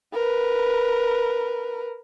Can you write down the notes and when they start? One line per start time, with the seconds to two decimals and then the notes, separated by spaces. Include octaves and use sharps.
0.14 A#4 B4